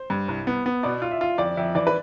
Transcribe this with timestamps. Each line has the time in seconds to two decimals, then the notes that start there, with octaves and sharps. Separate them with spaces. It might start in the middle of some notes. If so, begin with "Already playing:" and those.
Already playing: C5
0.10 G2
0.28 C2
0.47 B3
0.66 B3
0.83 B2 D5
1.02 F4
1.11 E5
1.21 F4
1.38 F2 D5
1.57 F2 E5
1.75 E3 D5
1.87 B4